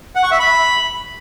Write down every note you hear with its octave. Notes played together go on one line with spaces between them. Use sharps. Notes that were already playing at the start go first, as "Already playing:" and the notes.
F#5
C#6
E5
B5